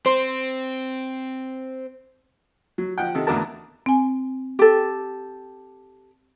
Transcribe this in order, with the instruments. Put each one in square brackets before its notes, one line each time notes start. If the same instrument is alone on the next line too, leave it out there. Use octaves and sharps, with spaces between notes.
[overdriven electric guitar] C4 [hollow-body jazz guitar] C5
[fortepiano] F#3
F3 F#5 G5
C3 D#3 A4
E2 A2 D3 F#4 A#4 A5
[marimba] C4 G#5
[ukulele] G4 A4